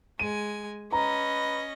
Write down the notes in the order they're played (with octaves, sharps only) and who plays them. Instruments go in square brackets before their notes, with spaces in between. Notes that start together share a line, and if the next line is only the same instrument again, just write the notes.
[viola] G#3 G#5 [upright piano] D#7
[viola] C#4 D#5 [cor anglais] B4 [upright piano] A#5